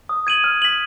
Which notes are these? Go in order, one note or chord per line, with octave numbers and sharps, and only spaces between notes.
D#6
G#6 D#7 F#7
F6
B6 F#7